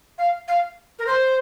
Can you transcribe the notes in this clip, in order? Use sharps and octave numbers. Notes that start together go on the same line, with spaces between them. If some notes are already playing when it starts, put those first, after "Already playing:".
F5
F5
A#4
C5